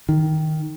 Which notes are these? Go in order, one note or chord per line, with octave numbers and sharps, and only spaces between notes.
D#3